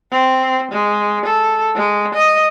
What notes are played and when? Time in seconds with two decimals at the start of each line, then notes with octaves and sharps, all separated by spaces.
0.11 C4
0.71 G#3
1.26 A4
1.76 G#3
2.14 D#5